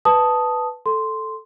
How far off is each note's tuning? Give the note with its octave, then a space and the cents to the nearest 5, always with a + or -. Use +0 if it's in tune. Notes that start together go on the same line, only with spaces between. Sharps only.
B4 +0 A5 +0 D#6 +0
A4 +0 C6 -5